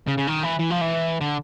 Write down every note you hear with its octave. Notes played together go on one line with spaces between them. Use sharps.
C#3
C#3
D#3
E3
E3
F3
E3
D3